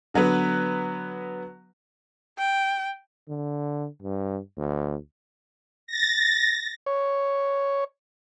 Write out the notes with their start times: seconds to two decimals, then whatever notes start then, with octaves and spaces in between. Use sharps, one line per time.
0.14 D3 F#3 B3 B4
2.38 G5
3.28 D3
4.02 G2
4.58 D2
5.87 A6 A#6
6.86 C#5